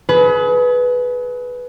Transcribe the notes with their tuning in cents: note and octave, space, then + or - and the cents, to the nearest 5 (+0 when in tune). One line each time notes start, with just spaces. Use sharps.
G#4 +35 B4 +0